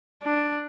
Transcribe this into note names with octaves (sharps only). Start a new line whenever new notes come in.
D4